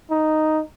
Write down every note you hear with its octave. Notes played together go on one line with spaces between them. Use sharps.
D#4